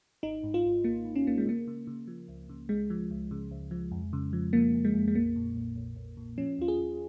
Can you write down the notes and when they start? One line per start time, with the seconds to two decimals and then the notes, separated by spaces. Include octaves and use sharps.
0.23 G#1 D#4
0.43 G#2
0.54 F4
0.65 G#1
0.84 G#1 A#3
1.05 G#2
1.15 C#4
1.26 G#1 A#3
1.38 G#3
1.46 C#3 A#3
1.67 C#3
1.87 C#3
2.07 F3
2.28 C#2
2.49 C#3
2.69 C#2 G#3
2.90 F3
3.11 C#2
3.31 C#3
3.51 C#2
3.71 F3
3.91 F2
4.13 C#3
4.33 F3
4.53 F3 A#3
4.74 F2
4.85 G#3
4.94 F2
5.08 G#3
5.15 A#1 A#3
5.36 A#2
5.56 A#1
5.76 A#1
5.96 A#1
6.17 A#2
6.38 F3 C#4
6.59 D#2 F4
6.68 G#4
6.79 D#2